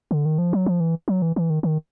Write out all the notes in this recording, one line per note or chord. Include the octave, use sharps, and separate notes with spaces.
D3
D#3
F3
F#3
F3
E3
F#3
E3
E3
D#3
D#3